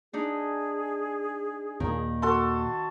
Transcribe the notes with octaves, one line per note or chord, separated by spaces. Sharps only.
D4 D#4 G#4
D#2 A#2 D#3 A#3
F#4 A4 C6